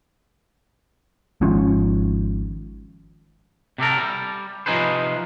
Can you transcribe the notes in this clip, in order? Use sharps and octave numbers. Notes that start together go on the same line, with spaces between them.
G#1 G#2 F3 C#4
C3 G4 A4 A#4
G3
C3 F3 D#4 G#4 B4 C5